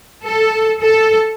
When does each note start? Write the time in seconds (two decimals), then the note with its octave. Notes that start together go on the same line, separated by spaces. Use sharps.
0.25 A4
0.82 A4